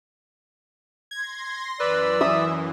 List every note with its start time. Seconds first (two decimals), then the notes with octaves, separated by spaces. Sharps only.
1.11 C6 G#6 A#6
1.80 F#2 E3 B4 D5 E6
2.21 E5 D#6